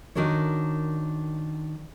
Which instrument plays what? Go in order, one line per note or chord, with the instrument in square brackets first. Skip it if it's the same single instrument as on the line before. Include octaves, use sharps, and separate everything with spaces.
[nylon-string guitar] D#3 D4 F#4 A#4 C#5